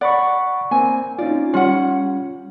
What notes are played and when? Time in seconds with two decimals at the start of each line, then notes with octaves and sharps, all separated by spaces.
0.01 D5 F#5 B5 C#6
0.71 A#3 C4 G#5
1.18 C#4 D#4 F4 D5
1.54 G3 C#4 F4 F#5